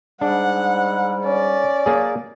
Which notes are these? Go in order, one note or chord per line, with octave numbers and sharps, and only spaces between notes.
G#2 G3 D4 F#5
C#4 D5
A#3 G#4